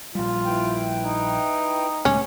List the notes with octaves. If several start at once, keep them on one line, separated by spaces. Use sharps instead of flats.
A#1 G3 F4
E4 B4 G5
D#4
C#2 A2 G#3 C#4